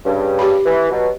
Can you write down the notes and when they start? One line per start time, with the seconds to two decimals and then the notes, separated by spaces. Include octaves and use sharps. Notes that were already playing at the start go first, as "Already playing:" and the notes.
0.05 G2 C#3
0.39 G4 B5
0.65 E3
0.91 B2 F#3